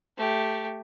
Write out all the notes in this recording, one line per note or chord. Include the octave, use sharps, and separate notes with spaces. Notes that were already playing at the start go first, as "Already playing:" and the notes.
A3 G4